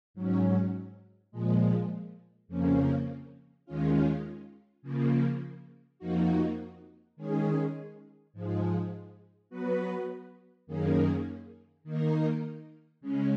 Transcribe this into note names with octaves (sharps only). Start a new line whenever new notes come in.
G#2 F#3 C#4
A#2 F3 G#3
F2 C#3 F3 A#3 C#4
D#2 D#3 G#3 C#4 F4
C#3 F3 A#3
F2 F3 A#3 D#4 F#4
D#3 G#3 C#4 G#4
G#2 F3 G#3
F#3 B3 F#4 B4
F#2 D#3 A#3 C#4 G#4
D#3 A#3 D#4 A#4
C#3 G#3 C#4